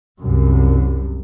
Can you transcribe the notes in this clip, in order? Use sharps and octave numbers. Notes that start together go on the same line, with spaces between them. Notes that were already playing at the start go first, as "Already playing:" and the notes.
C2 F#2